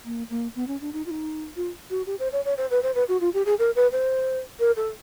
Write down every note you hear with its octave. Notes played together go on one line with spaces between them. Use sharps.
A#3
A#3
B3
C#4
D4
D#4
F4
D#4
F4
F#4
G4
C5
C#5
C#5
C5
B4
C5
B4
F#4
F4
G4
G#4
A#4
B4
C5
A#4
A4